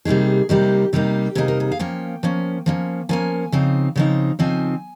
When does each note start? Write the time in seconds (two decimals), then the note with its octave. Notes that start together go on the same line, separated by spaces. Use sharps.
0.05 C3 G3 A#3 D#4 G#4
0.49 C3 G3 A#3 D#4 G4
0.93 C3 G3 A#3 D#4 G4
1.35 C3 G3 A#3 D#4 G#4
1.48 A#4
1.60 G#4
1.72 F5
1.79 F3 A#3 C#4 G5
2.23 F3 A#3 C#4
2.66 F3 A#3 C#4
3.09 F3 A#3 C#4 G#5
3.52 C#3 F3 C4 D#4
3.96 C#3 F3 C4 D#4
4.39 C#3 F3 C4 D#4 G#5